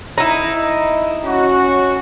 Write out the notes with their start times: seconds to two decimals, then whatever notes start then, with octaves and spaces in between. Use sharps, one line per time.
0.18 D#4 E4
1.25 C#4 F#4